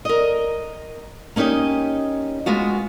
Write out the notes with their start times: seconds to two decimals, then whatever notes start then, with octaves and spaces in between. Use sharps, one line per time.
0.05 A#4 D#5
1.36 A#3 C#4 D#4 G4 D#5
2.46 G#3 B3 F4 F#4